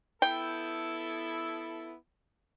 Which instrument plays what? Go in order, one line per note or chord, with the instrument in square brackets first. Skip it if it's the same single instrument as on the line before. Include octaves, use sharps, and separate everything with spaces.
[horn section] B3 E4 A4 [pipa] G5